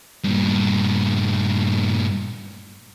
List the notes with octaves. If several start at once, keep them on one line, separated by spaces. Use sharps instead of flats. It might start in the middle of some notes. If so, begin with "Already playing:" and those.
G2 A#2